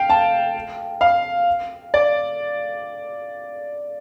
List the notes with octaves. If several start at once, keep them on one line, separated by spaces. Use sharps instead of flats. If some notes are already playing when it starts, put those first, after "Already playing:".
Already playing: F5 G5
A5
F5
D5